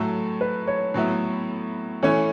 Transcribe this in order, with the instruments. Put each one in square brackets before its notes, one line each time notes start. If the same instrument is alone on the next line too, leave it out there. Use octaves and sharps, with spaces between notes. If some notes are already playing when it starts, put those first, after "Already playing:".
Already playing: [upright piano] A2 F#3 A3 [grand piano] A4
[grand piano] B4
C#5
[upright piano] A2 F#3 B3 E4
[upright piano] E3 A3 C#4 E4 [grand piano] C#5